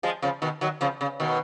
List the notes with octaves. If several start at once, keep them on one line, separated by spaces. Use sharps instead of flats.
F3 G#3
C#3 F3
B2 D#3
D#3 F#3
C#3 F3
C#3
B2 D#3